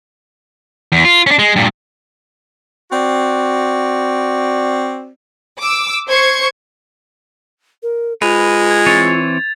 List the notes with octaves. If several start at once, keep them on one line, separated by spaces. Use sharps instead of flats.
E2
F4
C#4 D4
G#3
G2 A#2
C4 F#4 D5
D6 E6
C5 C#6 G#6
A#4
G#3 F4 B4 F7
G#6
E3 C4 C#5 A6